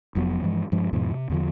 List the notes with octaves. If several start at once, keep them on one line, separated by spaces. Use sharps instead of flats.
F1 F2 F#3 B3
G2 E3 F3 G#3
G2 F3 G#3
E2 G#2 B2 F3
C3
E2 D3 F3